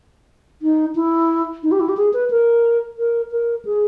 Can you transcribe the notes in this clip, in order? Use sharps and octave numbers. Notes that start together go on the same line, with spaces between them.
D#4
E4
D#4
G4
E4
G4
G#4
B4
A#4
A#4
A#4
G#4